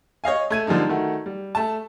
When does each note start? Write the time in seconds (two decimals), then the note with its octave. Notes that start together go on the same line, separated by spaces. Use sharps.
0.24 C#5 D#5 F5 G#5
0.50 A3 G#6 D#7
0.67 D3 F3 G3 A#3 D#4
0.89 D#3 A3 F#4
1.26 G3
1.55 A3 A5